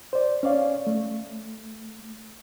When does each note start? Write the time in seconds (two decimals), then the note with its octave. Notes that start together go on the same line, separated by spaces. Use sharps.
0.13 C5 D5
0.43 C#4 C#5 D5 F5
0.87 A3